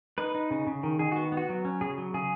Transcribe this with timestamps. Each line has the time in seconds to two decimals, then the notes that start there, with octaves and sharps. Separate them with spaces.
0.18 D#4 B4
0.35 D#4
0.51 C#3
0.67 C#3
0.83 D#3
0.99 D#3 G#4
1.12 B3 F#4
1.32 B3
1.37 F#4
1.49 F#3
1.65 C#4
1.81 C#3 G#4
1.98 F#3
2.14 C#3 G#4